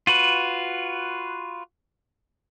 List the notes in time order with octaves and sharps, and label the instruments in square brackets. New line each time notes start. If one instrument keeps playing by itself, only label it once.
[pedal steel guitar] F4 F#4 B4